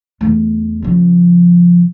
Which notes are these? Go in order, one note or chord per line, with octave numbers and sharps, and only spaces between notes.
E2 A3
C#3 F3